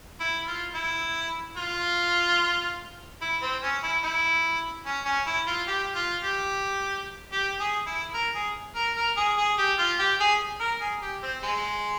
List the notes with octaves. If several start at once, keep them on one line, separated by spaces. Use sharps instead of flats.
E4
F4
E4
F4
E4
C4
C#4
E4
E4
C#4
C#4
E4
F4
G4
F4
G4
G4
G#4
E4
A#4
G#4
A#4
A#4
G#4
G#4
G4
F4
G4
G#4
A#4
G#4
G4
C4
G#3